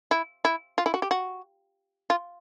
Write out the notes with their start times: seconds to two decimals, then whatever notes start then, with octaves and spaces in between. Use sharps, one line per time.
0.11 E4
0.45 E4
0.78 F4
0.86 E4
0.94 F#4
1.02 G4
1.11 F#4
2.10 F4